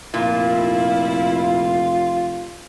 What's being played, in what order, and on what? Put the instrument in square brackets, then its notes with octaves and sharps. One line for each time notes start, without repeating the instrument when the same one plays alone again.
[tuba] F1 [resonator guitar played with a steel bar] A#2 [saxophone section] E4 F5 [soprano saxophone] F4